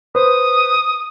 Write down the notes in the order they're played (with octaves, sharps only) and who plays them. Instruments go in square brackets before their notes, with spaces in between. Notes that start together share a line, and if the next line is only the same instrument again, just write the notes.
[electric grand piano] B4 C5 [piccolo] D#6